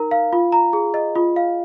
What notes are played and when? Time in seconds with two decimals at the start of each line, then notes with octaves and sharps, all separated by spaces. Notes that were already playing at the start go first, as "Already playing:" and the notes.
Already playing: D#4 A#4 A#5
0.11 F5
0.33 F4
0.52 A#5
0.73 G#4
0.94 D#5
1.15 F4
1.36 F5